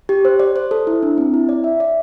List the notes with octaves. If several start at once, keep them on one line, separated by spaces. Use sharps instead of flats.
G4
C5
D5
C5
A4
E4
D4
C4
E4
D5
E5
D5